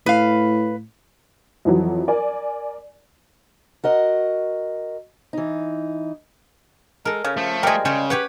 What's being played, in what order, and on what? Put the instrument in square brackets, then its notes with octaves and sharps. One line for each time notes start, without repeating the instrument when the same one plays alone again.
[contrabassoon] A2 [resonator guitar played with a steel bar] B4 F5
[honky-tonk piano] F2 E3 F#3
A#4 D5 G#5
[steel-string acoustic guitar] F#4 A#4 D#5
E3 D#4
[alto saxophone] G#3 [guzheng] A4 A#4
[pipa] C#3 [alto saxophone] C#4
[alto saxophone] F3 [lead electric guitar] A3
[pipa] G3 G#3 [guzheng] G#4 A#4
[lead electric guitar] C#3 [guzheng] C#4 C5 C#5
[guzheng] G4 C#5 F#5 [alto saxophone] B4